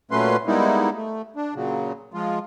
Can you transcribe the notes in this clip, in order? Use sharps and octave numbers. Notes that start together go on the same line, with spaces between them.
A#2 F#3 A3 C#4 B4 C6
G3 G#3 A#3 B3 D#4 E4
A3
D4
A#2 C#3 F#3
F3 G#3 F4